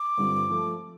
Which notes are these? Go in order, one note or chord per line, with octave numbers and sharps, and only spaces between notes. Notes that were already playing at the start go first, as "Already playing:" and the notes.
Already playing: D6
G2 D3 G3 C4 F4
F3 A3